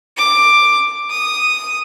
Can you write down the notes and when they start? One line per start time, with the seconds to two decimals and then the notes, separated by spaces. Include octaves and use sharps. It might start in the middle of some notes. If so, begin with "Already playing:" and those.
0.17 D6
1.10 D#6